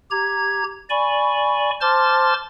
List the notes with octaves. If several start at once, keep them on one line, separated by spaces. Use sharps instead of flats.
G4 A#5 G#6
D5 G#5 B5 C#6
C5 A5 C6 D6 F6 A6